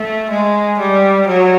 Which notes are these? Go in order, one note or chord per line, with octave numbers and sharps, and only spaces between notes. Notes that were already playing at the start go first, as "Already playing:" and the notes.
Already playing: A3
G#3
G3
F#3